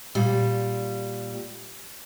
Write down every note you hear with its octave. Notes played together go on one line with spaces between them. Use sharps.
A#2 G3